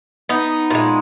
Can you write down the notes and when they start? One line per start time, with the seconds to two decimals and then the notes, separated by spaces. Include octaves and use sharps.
0.29 B3 D#4
0.70 A#2 G#3